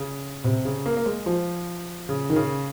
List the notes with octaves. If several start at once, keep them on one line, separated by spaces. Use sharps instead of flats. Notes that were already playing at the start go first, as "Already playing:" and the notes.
Already playing: C#3
C3
C#3
A#3
A#3
G#3
F3
C#3
D#3
C#3